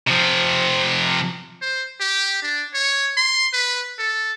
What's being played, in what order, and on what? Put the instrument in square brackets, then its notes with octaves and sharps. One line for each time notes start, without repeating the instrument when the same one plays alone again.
[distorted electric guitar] C3 F3
[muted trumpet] C5
G4
D4
C#5
C6
B4
A4